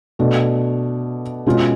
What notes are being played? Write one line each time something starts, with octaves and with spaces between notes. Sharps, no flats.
B2 A3 D4
B2 G#3 C#4 F4